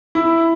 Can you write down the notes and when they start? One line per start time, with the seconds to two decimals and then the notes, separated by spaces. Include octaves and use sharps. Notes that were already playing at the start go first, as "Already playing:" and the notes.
0.15 E4